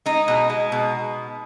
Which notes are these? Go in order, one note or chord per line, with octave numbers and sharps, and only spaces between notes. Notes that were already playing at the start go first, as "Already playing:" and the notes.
G#3 D#4
B2
G#3
B2